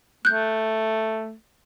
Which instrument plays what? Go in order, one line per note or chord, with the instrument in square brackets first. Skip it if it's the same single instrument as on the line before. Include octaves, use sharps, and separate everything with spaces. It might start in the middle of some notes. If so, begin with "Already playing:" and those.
[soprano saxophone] A3 [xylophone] F#6 G6